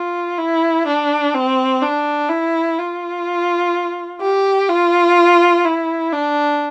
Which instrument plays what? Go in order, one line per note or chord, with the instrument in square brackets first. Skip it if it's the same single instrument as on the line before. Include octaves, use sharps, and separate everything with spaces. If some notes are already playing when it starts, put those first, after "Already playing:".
Already playing: [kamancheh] F4
E4
D4
C4
D4
E4
F4
G4
F4
E4
D4